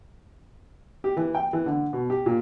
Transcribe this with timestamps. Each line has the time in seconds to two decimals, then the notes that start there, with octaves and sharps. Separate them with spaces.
1.04 G4
1.17 E3
1.35 G5
1.53 E3
1.66 D3
1.93 B2
2.10 G4
2.26 A#2